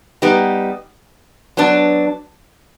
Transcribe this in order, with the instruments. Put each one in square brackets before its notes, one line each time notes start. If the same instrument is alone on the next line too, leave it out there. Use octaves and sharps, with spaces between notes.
[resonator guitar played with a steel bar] G3 B3 D#4 G4
F#3 B3 D4